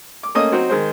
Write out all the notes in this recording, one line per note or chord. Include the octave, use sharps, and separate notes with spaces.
D6
A3 A#3 C#4 D#5 D#6
F#3 C4 D#4 F#4
D#3 G#3 C5